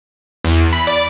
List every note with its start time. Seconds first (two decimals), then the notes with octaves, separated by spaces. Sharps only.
0.44 E2
0.73 B5
0.87 D5